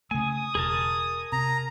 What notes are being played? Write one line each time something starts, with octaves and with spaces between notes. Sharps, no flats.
C#3 A3 G#5 D#6
E1 G#4 A#4 A5
C3 A#5